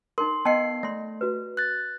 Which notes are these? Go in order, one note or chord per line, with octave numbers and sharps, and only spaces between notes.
D#4 A#4 C6
B3 D#5 G5 A5 C7
A3 D5 C6
F#4 B4
F#6 A6